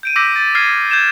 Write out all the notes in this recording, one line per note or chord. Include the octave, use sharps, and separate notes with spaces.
G6 D7 D#7
D6 E6 G6 A#6 B6
A6
E6 F6 G#6 C7 D#7
G6 G#6 E7